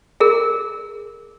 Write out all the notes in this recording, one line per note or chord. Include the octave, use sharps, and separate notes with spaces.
G#4 A#4